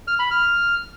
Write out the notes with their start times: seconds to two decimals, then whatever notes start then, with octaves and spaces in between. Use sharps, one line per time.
0.08 F6
0.19 B5
0.31 F6